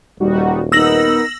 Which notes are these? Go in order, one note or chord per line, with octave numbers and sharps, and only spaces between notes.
D#1 G3 D#4 F#4
B3 D#4 A#4 E6 A#6 F#7